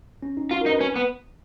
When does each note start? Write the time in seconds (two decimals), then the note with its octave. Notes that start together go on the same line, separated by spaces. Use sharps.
0.23 C#4
0.37 D#4
0.51 F4 F#4
0.61 A#4
0.66 D#4
0.71 B4
0.81 C#4
0.96 B3